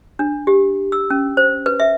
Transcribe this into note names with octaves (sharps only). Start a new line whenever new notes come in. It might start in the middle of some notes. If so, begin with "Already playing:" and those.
D4
G4
E6
C#4
C5
B4
E5